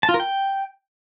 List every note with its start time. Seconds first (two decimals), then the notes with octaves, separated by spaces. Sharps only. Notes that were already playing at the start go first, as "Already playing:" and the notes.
0.03 A5
0.09 F4
0.14 A#4
0.20 G5